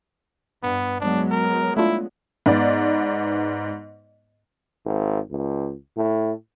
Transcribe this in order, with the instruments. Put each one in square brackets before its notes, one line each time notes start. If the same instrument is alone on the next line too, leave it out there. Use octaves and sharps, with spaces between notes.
[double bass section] G2 [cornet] B3
[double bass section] F#3 G#3 B3 [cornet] D4
[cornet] A#4
[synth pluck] A3 D4 F4 [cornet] E4
[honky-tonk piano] G#2 B3 D5
[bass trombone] G#1
C#2
A2